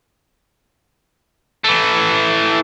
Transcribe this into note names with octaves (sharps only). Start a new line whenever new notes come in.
E3 A3